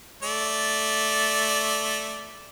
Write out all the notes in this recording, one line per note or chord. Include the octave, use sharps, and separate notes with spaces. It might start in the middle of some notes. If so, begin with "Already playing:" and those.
A3 D5